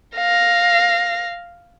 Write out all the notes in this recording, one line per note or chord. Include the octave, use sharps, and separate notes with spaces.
F5 A#6